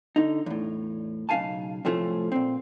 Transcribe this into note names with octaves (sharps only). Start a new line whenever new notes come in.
D3 D#4
E2 A2
B1 C#3 E4 F5 G#5 A5
A2 C3 F3 A3 C#4
A#2 C4